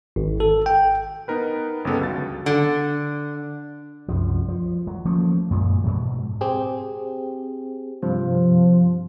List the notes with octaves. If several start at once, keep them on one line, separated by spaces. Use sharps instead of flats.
G#1
A4
G5
B3 D#4 A#4 B4
G1 C#3 B3 A4
C#2 F#3 A6
D3
C2 F#2 F3
F3
F#3
F3 A3 A#3 C#4
F#2 A#2 G#3
G#2 B2 F#3
C4 G4 G#4
G2 C3 F3